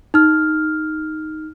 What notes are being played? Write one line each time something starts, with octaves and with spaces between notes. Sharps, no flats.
D#4 F6